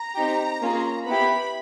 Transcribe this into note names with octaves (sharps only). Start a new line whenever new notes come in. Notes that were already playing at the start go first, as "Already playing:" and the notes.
Already playing: A#5
C4 D#4 G4
A#3 C#4 F4 G#4
B3 E4 G4 B5